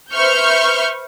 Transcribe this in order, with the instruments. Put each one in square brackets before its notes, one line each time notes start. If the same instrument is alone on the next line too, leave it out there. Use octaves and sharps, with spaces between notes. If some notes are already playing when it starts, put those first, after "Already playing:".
[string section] B4 C5 E5 C#6 F6 G6